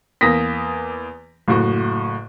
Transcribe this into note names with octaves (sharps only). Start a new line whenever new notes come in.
E2 A#3 D#6 A#6 B6
F#1 A2 F#4